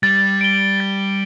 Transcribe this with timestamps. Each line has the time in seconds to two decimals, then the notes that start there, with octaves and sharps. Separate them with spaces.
0.03 G3 A6
0.41 D7 G7
0.80 A6